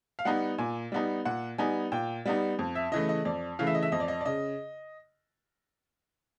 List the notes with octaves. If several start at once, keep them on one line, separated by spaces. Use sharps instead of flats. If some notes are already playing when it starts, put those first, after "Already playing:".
F5
G3 B3 D#4 F#5
A#2 G#5
G3 B3 D#4
A#2 F#5
G3 B3 D#4 G#5
A#2 G5
G3 B3 D#4
F2
E5
C#3 E3 A3 D#5
D#5
F2 D5
C#3 E3 A3 F5
E5
D#5
E5
F2 D#5
D5
D#5
D5
C#3 D#5